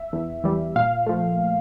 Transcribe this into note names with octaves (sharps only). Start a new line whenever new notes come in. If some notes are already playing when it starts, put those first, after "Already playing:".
Already playing: E5
E2
E3 G3
A#2 F5
F3 A3